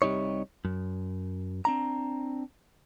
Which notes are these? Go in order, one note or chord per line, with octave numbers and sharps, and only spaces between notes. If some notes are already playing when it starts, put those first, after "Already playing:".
C2 C3 G3 D#4 C#5
F#2
C4 D4 A#5